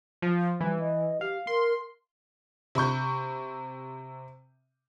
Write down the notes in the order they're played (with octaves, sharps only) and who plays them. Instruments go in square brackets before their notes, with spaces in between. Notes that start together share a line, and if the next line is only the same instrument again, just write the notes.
[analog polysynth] F3
[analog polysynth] E3 [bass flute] G3
[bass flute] D#5
[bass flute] G4 [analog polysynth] F5
[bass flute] A#4 [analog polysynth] C6
[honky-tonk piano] C3 B5 C#6 G6